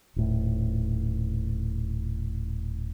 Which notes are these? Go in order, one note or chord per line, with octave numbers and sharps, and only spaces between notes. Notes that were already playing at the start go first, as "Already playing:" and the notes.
D#1 A2